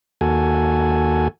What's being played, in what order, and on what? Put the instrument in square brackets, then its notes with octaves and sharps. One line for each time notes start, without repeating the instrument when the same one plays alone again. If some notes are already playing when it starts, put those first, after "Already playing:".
[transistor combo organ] D#2 F#4 A4 G#5